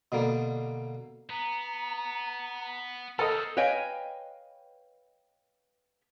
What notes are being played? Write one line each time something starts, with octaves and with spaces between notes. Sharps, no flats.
B2 D3 G3 A#3
B3 A#5
C#4 A4 A#4 C5 D#5 E6
B4 C#5 D#5 F5 G5 G#5